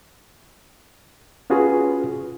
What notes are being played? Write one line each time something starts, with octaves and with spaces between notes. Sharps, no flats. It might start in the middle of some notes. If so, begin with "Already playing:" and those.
C#4 F4 F#4 G#4 B4